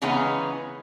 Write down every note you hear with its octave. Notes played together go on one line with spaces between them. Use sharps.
C#3 E3 G#3 B3 C#4 D#4